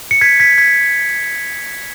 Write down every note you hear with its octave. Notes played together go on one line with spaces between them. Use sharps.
C#7
G#6 B6
G#6 B6
G#6 B6